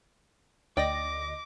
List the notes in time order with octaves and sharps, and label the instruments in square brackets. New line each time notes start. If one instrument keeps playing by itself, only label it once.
[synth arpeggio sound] D2 D#5 A#6 [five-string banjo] D5 G5 [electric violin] D6